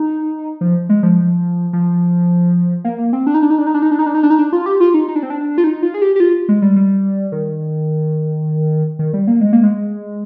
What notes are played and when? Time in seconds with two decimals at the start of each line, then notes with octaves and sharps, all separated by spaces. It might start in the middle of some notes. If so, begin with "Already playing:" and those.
Already playing: D#4
0.61 F3
0.89 G#3
1.03 F3
1.73 F3
2.84 A#3
2.98 A#3
3.13 C4
3.27 D4
3.34 D#4
3.42 D4
3.50 D#4
3.58 D4
3.67 D#4
3.74 D4
3.82 D#4
3.91 D4
3.99 D#4
4.06 D4
4.14 D#4
4.23 D4
4.30 D#4
4.39 D4
4.53 F4
4.66 G4
4.80 F4
4.94 D#4
5.08 D#4
5.15 D4
5.23 C4
5.30 D4
5.58 F4
5.64 D#4
5.82 F4
5.94 G#4
6.02 G4
6.16 G4
6.20 F4
6.49 G#3
6.62 G3
6.76 G3
7.32 D#3
8.99 D#3
9.13 G3
9.27 A#3
9.41 G#3
9.53 A#3
9.63 G#3